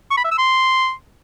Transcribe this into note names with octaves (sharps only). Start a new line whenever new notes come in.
C#6
B5
E5
E6
C6